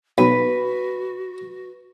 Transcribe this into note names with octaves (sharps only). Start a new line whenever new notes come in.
B1 F#4 B4